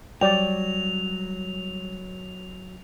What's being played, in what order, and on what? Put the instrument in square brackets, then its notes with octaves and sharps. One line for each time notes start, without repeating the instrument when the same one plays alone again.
[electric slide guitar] F#3 [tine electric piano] G3 [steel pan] D5 G5 [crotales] F7